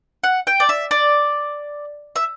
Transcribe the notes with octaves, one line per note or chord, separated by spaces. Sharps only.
F#5
G5
D5
E5
D5
E5